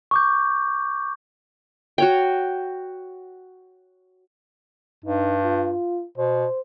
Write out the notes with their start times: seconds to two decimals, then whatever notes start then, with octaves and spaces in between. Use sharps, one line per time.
0.11 C#6 D6 G6
1.98 F#4 C#5 G5
5.05 G2 D#4
5.45 F4
6.18 B2 C5